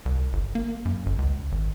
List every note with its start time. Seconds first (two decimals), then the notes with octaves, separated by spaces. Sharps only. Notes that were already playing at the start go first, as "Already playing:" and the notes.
0.05 C2
0.33 G1
0.55 A#3
0.85 F#2
1.06 G1
1.18 C#2
1.52 G#1